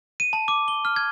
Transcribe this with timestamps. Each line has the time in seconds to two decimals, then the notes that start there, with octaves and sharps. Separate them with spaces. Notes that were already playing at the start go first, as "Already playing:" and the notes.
0.20 D#7
0.33 A5
0.48 D6
0.68 G7
0.85 F6
0.96 G#6